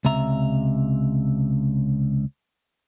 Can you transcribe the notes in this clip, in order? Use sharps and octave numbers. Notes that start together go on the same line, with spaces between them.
C#2 C3 E5 A#5